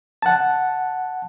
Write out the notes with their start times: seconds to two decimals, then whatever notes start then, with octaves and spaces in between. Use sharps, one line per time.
0.22 F#5 A5